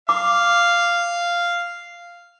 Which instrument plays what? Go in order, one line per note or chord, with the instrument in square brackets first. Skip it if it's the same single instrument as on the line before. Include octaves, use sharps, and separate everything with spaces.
[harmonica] F5 [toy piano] D6